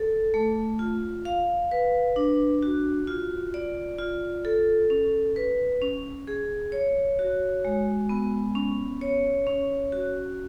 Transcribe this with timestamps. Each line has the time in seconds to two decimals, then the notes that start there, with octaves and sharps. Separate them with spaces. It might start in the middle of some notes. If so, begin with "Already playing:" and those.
Already playing: A4
0.34 A3
0.79 F4
1.25 F5
1.71 B4
2.16 D4
2.62 F#4
3.07 F4
3.54 D5
3.98 F4
4.45 A4
4.90 C#4
5.36 B4
5.82 C#4
6.28 G#4
6.72 C#5
7.19 F#4
7.65 G#3
8.09 B3
8.55 C#4
9.01 C#5
9.47 C#4
9.92 F#4